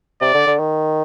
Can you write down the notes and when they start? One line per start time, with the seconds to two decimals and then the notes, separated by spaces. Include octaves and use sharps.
0.21 C3 D5
0.34 D3
0.47 D3
0.59 D#3